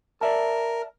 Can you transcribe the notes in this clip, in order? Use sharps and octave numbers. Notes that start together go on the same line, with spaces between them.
A#4 D5 E5 A5